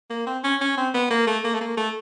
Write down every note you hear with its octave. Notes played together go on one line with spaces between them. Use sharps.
A#3
C4
C#4
C#4
C4
B3
A#3
A3
A#3
A3
A#3
A3